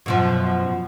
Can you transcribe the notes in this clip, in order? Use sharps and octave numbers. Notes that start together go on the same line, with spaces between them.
F#2 B2 F3